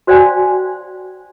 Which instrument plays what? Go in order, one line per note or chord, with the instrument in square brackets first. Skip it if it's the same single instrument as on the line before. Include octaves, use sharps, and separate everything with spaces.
[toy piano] F#4 C5 D5 F5 G5 G#5